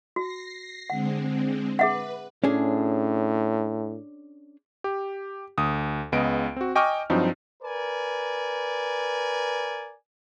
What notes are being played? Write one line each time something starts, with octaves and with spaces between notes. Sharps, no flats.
F#4 A#6 C7
D3 G#3 C4 F#5
G#4 B4 E5 F#5
A2 C#4 D4 G#4
G4
D2 D#6
C#2 C#3 B3 D#5 D7
C4 F#4
D#5 G5 G#5 C#6 D6 F6
G2 F3 F#3 C4 D#4
A#4 B4 D5 G#5